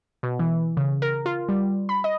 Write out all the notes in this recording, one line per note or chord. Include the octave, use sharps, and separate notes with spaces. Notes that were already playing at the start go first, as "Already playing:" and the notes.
B2
E3
C#3
A#4
F4
G3
B5
D#5